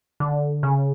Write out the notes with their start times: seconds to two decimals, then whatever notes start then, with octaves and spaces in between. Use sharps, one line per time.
0.20 D3
0.63 C#3